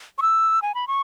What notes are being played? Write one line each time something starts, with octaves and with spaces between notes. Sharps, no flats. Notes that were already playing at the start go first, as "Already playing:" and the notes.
C#6
E6
G#5
B5
C#6